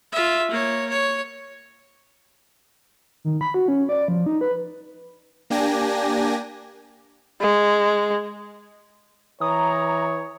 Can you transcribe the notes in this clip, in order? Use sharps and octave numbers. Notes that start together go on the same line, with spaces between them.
F4 E5
A#3 C#5
C#5
D#3
B5
F#4
C#4
D5
F3
D#4
B4
A#3 D4 G4 G#5 A#6
G#3
E3 C#5 A#5 D#6